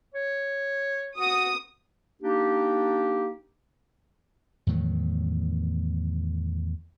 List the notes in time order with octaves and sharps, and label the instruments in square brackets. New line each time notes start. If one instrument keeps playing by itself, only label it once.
[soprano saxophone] C#5
[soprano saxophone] F#4 [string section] D#6
[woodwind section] A#3 D4 D#4 G4
[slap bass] E2 A2 D#3 F#3